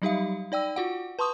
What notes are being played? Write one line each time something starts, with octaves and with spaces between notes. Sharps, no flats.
F#3 G3 D#4 G4 E5 F5
D#4 D5 G5 E6
F4 F#4 F#5
B4 A5 C6 C#6 D#6